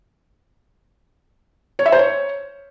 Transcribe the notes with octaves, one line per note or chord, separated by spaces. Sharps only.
C#5
E5
C5
C#5